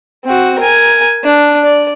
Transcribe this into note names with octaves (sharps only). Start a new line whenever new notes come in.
C4 F#4
A#4 G#5
D4
D5